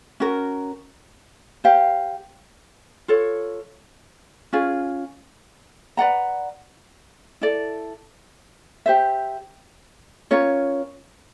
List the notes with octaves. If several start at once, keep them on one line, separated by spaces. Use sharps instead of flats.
C#4 F#4 A#4
G4 C5 F5
F4 A4 C#5
C#4 F4 G#4
B4 D5 F#5 A#5
E4 A4 D5
G4 C5 E5
C#4 F4 A#4 C#5